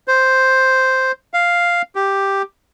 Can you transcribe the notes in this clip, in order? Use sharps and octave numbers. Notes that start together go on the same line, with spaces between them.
C5
F5
G4